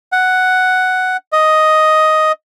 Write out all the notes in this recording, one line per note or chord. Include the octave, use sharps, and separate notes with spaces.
F#5
D#5